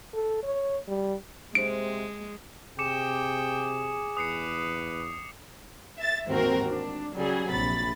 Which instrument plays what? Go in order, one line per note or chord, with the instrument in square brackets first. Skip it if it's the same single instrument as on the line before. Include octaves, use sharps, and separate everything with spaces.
[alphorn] A4
C#5
G3
[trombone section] C3 C5 [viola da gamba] G#3 [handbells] D7
[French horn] C3 [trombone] G#4 [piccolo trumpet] G5 [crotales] D6 C#7 E7
[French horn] E2 [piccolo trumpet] B4 [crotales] D#6 C7 C#7
[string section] E5 A6
A1 D#2 G#2 C4 F#4 A#4
D4
C#3 F#3 G3 G#4
A#1 C3 B5 A6